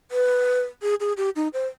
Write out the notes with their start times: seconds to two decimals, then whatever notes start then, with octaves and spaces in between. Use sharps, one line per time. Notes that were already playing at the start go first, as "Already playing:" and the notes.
0.11 B4
0.82 G#4
1.00 G#4
1.17 G4
1.36 D#4
1.53 C5